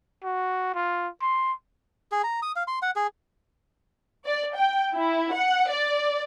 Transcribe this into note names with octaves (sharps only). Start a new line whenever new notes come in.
F#4
F4
C6
G#4
A#5
D#6
F5
C6
F#5
G#4
D5
G5
E4
F#5
D5